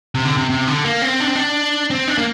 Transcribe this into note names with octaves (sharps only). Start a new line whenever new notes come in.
C3
D3
C3
C3
D3
A#3
C4
D4
C4
D4
C4
D4
A#3